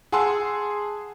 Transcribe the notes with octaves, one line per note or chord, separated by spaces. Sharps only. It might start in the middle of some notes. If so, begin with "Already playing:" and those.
G#4 F#5 G#5 A5 C6 E6